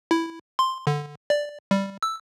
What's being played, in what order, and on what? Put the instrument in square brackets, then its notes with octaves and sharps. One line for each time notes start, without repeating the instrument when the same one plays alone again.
[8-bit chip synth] E4
C6
D3
D5
G3
E6